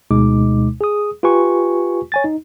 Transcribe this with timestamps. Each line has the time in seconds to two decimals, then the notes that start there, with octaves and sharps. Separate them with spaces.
0.11 D2 B2 G#3 D#4 D6
0.81 G#4 D#6
1.23 F4 G4 B4 G#5 C#6
2.12 C#5 G#5 A6
2.24 D#4